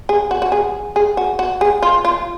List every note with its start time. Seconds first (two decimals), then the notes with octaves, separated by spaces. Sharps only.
0.09 G#4
0.31 F#4
0.42 F#4
0.52 G#4
0.96 G#4
1.17 F#4
1.39 F#4
1.61 G#4
1.82 F4
2.05 F4